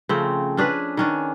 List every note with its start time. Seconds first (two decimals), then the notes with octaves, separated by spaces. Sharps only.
0.09 C#3 F3 A3 C4
0.57 C#4 D4 G#4 B4
0.97 D#3 C#4 D4